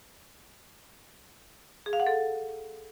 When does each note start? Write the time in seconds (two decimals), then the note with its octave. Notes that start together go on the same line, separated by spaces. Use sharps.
1.86 G#4
1.93 F5
2.00 F#5
2.07 A4